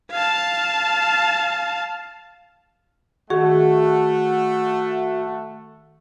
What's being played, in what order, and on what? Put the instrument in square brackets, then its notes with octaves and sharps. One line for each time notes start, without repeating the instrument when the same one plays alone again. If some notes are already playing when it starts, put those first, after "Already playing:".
[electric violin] F5 A5
[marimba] D#3 G#4 [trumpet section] A3 F#5 [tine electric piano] F#4